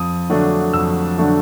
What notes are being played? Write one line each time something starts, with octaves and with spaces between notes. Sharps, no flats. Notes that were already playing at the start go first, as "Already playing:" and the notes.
Already playing: F2 D#6
D3 F#3 A3 D4
F2 E6
D3 F#3 A3 D4